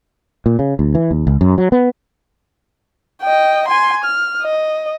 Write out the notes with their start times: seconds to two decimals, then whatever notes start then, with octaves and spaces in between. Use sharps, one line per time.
0.46 A#2
0.59 C#3
0.79 D2
0.95 E3
1.11 D#2
1.27 C#2
1.41 F#2
1.58 F#3
1.72 B3
3.22 D#5 G5
3.68 G#5 C6
4.04 F6
4.43 D#5